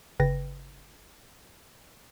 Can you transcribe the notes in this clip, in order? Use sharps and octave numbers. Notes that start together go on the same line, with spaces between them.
G1 C#3 B4 G5 A6 A#6